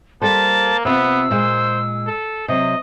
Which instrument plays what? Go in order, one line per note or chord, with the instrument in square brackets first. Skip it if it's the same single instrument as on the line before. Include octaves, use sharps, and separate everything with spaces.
[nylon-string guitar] G3 A4 C5 [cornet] A#3 [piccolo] A5
[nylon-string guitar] C3 C4 F4 [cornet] B3 [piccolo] E6
[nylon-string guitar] A#2 G#3 [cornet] C5
[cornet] A4
[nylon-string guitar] C3 F#3 [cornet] D#5